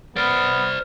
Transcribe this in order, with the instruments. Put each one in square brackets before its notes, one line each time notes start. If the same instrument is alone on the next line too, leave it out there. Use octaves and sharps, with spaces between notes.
[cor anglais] B3 [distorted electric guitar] C5 D5 [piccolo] F6